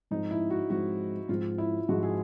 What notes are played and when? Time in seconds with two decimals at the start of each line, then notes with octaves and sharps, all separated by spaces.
0.11 G#2 F3 G#3 C4 D#4
0.31 E4
0.50 F#4
0.70 G#2 F3 G#3 C4 F#4
1.29 G#2 F3 G#3 C4 F4
1.58 E4
1.89 G#2 F3 G#3 C4 F#4
2.03 G#4